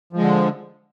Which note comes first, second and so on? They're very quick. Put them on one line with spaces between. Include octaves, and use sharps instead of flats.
F3 G#3 D3